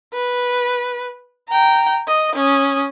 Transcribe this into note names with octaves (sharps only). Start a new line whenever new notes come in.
B4
G5 A#5
D#5
C#4 D#6